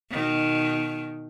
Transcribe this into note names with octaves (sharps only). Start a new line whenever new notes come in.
B2 D#3